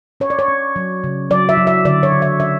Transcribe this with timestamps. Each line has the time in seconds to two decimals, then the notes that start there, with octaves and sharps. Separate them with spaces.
0.20 C#4 C#5
0.30 D5
0.39 C#5
0.48 C#4
0.76 F#3
1.04 C#3
1.30 F#3 D5
1.49 E5
1.57 F#3
1.67 E5
1.85 D3 D5
2.03 C#5
2.12 D3
2.22 E5
2.40 C#4 E5